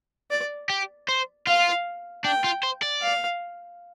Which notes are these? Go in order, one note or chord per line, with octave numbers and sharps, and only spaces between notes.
D5
G4
C5
F4 F5
D4 G5
F4
C5
D5
F5